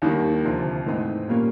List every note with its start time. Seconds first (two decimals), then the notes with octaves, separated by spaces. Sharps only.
0.02 D#2 D#3 G3
0.44 D2 C3 F3
0.86 G#2 E3 A3 C4 D#4
1.28 A#2 G3 A#3 C#4